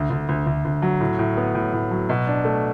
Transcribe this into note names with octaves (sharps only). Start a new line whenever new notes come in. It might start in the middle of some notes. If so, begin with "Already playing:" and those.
Already playing: D2
D2
D2
D2
D2
F#3
A2
A2
B3
A2
A2
F#3
B2
D4
A3